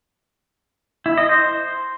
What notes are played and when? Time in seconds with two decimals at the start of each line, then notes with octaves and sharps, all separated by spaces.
1.06 E4
1.17 D#5
1.29 C5